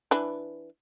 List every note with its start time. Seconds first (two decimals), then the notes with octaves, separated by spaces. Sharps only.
0.11 E3 D4 B4